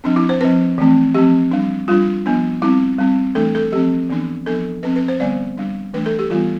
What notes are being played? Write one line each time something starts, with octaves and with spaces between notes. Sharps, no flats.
F3 C4 D4
E4
C5
F3 C4 B4
E3 A3 C4
F3 C4 G4
G3 D4
G3 D4 F4
F3 B3 D4
G3 C4 E4
G3 C4
E3 A3 D4 A4
A4
F3 C4 G4
E3 B3 D4
F3 B3 D4 A4
F3 C4 B4
B4
C5
D3 G3 B3 D5
G3 D4
E3 A3 D4 B4
A4
G4
E3 G3 B3 F4